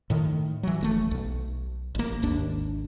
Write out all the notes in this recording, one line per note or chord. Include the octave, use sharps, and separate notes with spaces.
A2 D#3
E3 F#3
E1 G#3 A3
B1
A1 A#3
G#1 D#2 D4